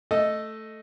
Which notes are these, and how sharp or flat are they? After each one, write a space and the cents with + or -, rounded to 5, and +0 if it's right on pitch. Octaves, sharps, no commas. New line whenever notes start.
A3 +0 A4 +0 D#5 +0